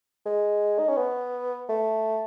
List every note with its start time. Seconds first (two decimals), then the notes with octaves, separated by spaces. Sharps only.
0.26 G#3
0.79 D#4
0.88 C#4
0.97 B3
1.69 A3